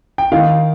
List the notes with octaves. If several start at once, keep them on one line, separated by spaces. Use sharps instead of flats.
G5
D#3 F5